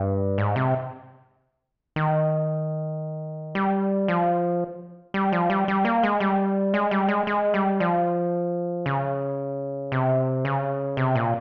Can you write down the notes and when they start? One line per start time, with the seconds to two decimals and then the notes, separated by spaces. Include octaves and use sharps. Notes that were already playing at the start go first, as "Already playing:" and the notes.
Already playing: G2
0.38 G#2
0.56 C3
1.96 D#3
3.55 G3
4.08 F3
5.14 G3
5.32 F3
5.50 G3
5.68 G3
5.85 A#3
6.03 G#3
6.20 G3
6.74 G#3
6.91 G3
7.08 G#3
7.27 G#3
7.54 G3
7.80 F3
8.86 C#3
9.92 C3
10.45 C#3
10.97 C3
11.15 A#2